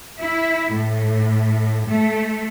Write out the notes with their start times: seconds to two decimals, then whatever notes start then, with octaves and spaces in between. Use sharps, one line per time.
0.20 E4
0.73 A2
1.87 A3